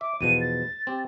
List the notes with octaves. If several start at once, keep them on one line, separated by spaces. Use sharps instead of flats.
E5 D6
E2 B2 F3 D#7
A6
C4 G4